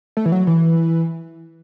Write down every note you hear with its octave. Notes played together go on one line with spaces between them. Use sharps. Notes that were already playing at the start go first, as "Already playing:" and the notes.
A3
E3
F#3
E3